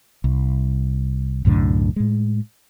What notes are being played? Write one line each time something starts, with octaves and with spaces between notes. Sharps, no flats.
C2
C2 F#2 A2 D3
A2 G#3